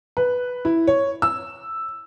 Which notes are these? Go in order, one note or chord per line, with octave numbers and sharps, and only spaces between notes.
B4
E4
C#5
E6